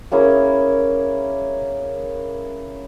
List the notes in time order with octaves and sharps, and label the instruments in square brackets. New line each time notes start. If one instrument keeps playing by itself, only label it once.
[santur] A#3 C#4 E4 G#4